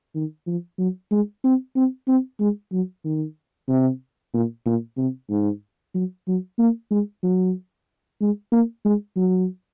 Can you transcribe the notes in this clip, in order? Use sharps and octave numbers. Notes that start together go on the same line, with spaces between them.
D#3
F3
F#3
G#3
C4
C4
C4
G#3
F#3
D#3
C3
A#2
A#2
C3
G#2
F#3
F#3
A#3
G#3
F#3
G#3
A#3
G#3
F#3